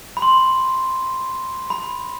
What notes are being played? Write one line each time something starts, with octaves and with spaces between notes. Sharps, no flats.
B5
C6
B5